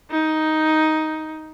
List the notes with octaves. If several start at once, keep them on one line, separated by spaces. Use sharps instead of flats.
D#4